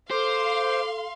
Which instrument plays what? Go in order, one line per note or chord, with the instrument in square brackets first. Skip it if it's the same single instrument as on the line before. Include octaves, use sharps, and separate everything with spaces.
[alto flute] A4 [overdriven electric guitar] C5 [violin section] F5 C6 [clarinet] D6